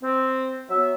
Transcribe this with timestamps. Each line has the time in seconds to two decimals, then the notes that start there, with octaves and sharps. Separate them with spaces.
0.03 C4
0.70 F#3 B3 E5